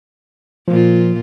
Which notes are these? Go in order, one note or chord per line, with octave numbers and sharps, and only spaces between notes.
A#2 F3 F4